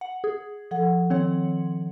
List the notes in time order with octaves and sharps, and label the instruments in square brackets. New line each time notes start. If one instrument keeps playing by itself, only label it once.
[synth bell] F#5
G#4
[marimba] F3 A4 F#5
[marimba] D#3 [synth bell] C4 C#5 F#5